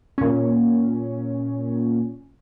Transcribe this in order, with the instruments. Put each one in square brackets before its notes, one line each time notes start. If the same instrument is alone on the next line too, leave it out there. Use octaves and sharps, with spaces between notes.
[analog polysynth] A#2 C#4